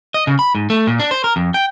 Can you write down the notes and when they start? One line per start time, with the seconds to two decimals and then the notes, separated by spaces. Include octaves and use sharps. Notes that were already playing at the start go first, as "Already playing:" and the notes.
0.14 D#5
0.27 C#3
0.39 B5
0.55 G#2
0.70 A3
0.87 A#2
0.99 D4
1.11 C5
1.24 A#4
1.36 F2
1.54 G5